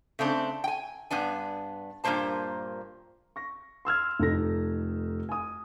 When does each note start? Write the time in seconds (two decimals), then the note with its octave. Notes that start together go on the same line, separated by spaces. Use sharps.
0.19 C#3 A3 C4 D4
0.64 G5 G#5
1.11 G2 B3 D4 G#5
2.04 G2 A#2 F3 A#3 C5 A5
3.36 C#6 A#6
3.85 C6 E6 F6 G#6
4.19 F1 D#4 A4 A#6
5.29 G#5 D#6